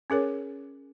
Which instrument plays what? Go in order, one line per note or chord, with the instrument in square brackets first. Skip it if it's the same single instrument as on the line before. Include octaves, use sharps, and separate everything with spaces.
[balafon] C#4 G#4 A#4 C#5